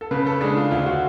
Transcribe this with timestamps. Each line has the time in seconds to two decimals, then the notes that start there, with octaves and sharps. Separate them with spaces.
0.01 A4
0.11 C#3 B4
0.27 A4
0.41 G#3 D4 G#4
0.56 F4
0.71 D2 F4
0.86 F#4